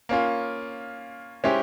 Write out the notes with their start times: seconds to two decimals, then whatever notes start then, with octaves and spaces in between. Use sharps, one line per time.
0.09 A#3 C#4 F4
1.44 G#3 C#4 E4 G4 C5